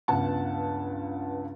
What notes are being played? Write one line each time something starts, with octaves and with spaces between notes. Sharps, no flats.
C#2 G2 B3 F#5 A5